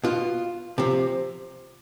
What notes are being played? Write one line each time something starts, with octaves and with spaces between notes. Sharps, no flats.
B2 F4
C3 F3